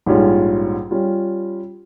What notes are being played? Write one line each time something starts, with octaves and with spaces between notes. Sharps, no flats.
A#1 G#2 G3 C#4 F4
G3 C#4 F4